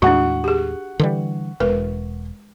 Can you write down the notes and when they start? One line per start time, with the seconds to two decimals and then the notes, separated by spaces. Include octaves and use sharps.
0.02 D#2 A2 G#3 D4 F#4 F#5 C#6
0.44 G4 G#4
0.99 D3 E3 G3
1.60 E1 G#3 A#4 B4